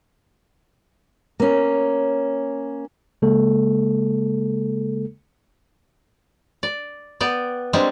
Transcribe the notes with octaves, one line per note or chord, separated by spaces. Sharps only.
A#3 C#4
C#3 G#3 A#3 A4
D5
B3 D5 G5
G3 G#3 A#3 C4 D4